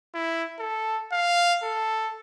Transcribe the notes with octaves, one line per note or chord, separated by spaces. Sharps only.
E4
A4
F5
A4